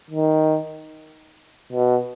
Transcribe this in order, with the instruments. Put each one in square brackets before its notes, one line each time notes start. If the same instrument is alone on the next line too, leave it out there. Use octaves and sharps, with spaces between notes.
[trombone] D#3
B2